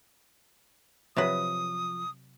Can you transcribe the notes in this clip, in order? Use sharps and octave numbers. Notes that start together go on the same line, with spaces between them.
C3 F3 F#3 F4 B4 D#6